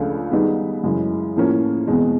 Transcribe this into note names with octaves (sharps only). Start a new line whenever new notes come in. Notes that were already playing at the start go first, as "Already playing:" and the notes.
Already playing: C#2 C#3 F3 A3 D4
D#3 G3 B3 D#4 G#4
F#2 C#3 E3 G#3
A2 F3 A#3 C#4
E2 B2 G#3 C4